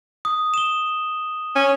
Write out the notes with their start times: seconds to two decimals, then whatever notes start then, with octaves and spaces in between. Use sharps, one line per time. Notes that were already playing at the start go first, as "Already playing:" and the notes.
0.25 D#6
0.54 E7 G7
1.56 C#4